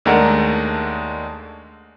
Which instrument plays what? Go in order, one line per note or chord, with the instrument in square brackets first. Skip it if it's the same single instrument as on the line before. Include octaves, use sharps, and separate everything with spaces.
[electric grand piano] D#2 G#3 A3 D4 A#4 F#5